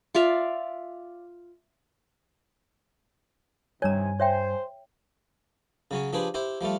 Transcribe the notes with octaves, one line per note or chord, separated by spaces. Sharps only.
F4 D5 E5 F5
G2 C3 D#3 C#5 G#5 A#5
C5 C#5 E5 G5
C#3 F#3 C#4
F3 D4 G4 G#4 B4 C5
E4 G4 C5
F3 G3 A3 F4